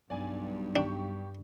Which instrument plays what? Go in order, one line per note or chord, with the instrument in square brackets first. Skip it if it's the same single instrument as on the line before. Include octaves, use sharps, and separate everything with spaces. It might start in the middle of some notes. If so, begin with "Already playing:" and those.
[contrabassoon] B1 [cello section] G2 [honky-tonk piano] D5 G#5
[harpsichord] D4 [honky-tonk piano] G4 C#6